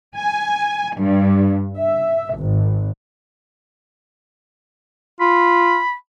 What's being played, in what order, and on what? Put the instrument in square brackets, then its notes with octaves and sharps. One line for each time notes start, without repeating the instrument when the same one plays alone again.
[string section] G#5
G2
E5
G#1
[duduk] F4 [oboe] B5